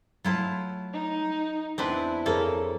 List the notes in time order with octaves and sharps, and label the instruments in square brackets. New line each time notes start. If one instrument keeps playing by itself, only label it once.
[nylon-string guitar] F#3 A3 A5 [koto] E4 F4
[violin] D#4
[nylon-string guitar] E2 [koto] C4 D4 B4 [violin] E4
[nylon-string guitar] F2 G#4 C#5 [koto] A#3 A4